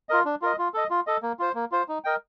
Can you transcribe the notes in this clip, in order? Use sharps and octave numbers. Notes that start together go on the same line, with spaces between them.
F4 A#4 D#5
D4
F4 A#4 D#5
F4
A4 D#5
F4
A4 D#5
A#3
F4 C5
A#3
F4 C5
D#4
A#4 D#5 G5